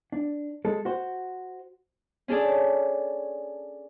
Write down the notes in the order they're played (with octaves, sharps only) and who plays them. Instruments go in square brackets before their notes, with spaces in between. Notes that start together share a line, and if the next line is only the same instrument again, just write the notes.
[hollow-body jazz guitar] D4
G#3 A4
F#4 C5
[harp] C#4 D4 G#4 A4 D5